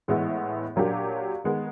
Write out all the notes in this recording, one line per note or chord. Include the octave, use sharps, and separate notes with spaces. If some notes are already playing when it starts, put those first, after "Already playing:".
A2 E3 G#3 B3 E4
A#2 F#3 A#3 D4 G4
D#3 G#3 B3